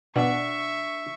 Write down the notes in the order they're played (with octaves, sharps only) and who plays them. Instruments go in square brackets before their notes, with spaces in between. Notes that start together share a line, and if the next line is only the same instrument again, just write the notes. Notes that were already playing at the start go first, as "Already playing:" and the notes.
[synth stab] B2 [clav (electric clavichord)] D4 F#5 [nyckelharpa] E5 C#6